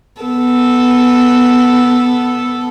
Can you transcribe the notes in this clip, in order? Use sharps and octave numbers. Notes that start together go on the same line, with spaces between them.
B3 A4